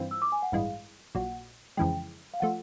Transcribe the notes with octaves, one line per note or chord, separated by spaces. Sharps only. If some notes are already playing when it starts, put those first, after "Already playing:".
Already playing: G2 E3 C4 F4
E6
D6
G#5
F#5
A1 G2 E3 G#3 F5
A#1 A#2 F#3 F#5
F2 C#3 E3 G#3 G5
F5
F3 A3 F#5